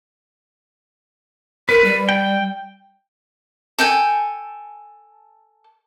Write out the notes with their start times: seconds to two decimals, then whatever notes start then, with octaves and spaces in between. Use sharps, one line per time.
1.69 A#4 B4
1.84 G3
2.09 G5
3.79 A4 G5 G#5